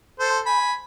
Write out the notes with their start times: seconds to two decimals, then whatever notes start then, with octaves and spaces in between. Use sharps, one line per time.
0.20 A4 C5
0.46 G#5 B5